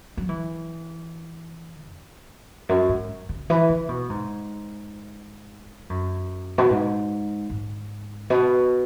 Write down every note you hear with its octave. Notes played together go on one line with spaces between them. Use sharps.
F#3
E3
E2
F#2
G#2
C#3
E3
C#3
B2
G#2
F#2
B2
G#2
G#2
B2